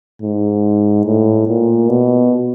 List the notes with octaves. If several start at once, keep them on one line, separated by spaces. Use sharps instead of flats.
G#2
A2
A#2
B2